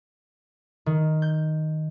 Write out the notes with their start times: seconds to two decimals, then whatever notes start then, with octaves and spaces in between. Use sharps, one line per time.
0.86 D#3
1.22 G6